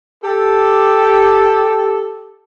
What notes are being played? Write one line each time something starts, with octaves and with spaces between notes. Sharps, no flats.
G4 A4